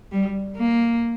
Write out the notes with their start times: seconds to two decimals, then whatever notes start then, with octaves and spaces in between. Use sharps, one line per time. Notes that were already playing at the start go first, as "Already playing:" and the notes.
0.12 G3
0.57 A#3